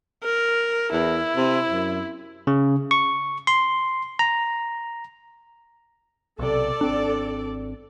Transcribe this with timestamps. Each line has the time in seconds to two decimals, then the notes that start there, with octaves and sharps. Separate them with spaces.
0.24 A#4
0.93 E2 E4
1.36 C3
1.69 F#2
2.47 C#3
2.91 C#6
3.47 C6
4.19 A#5
6.39 B1 C3 A4 D5
6.81 G#1 C4 D4